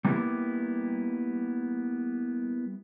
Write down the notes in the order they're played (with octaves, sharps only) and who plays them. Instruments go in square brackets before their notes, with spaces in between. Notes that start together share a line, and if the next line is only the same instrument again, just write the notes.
[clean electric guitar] G3 A#3 B3 E4 G4